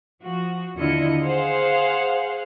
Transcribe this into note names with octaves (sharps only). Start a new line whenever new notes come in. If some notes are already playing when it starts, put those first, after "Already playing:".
F3 F#4
D#2 D3 E4 F4 D#5 C#7
G#4 C5 F5 F#5